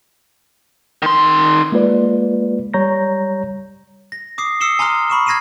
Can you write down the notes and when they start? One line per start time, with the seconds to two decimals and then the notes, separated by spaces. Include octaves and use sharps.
1.02 D#3 C6
1.72 G#3 A#3 F4 B4 D5
2.74 G3 C#5 A#5 G6 A#6
4.12 A#6
4.38 D6 D#6 C7
4.60 D#6 E6 C7 C#7 E7 G7
4.79 G#5 A#5 C6 D#6 F6
5.10 B5 C#6 E7
5.26 F6 G#6 A#6 C7 D#7 E7